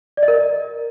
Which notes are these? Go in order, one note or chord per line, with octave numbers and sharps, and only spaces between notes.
D5
D#5
A#4